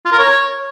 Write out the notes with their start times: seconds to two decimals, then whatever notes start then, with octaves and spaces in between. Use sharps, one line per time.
0.05 F4
0.12 A#4
0.18 C#5